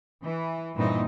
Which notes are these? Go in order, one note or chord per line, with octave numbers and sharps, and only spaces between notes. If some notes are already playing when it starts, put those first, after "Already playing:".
E3
G2 A#2 E3 C4 D#4